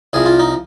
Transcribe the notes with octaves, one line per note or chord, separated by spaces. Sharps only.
C2 C3 F3 G#4
F4
D#4